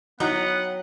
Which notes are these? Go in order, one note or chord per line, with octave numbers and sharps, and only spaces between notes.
F#3 B3 D#4 E4 F#5 G5 A#5